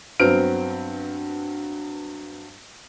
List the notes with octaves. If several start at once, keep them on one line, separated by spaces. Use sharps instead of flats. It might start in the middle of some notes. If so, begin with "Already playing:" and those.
G2 F#3 B3 C4 F6 D7